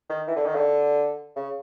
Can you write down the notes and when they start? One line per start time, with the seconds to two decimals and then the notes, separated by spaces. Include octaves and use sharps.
0.09 D#3
0.28 E3
0.37 D3
0.46 D#3
0.55 D3
1.36 C#3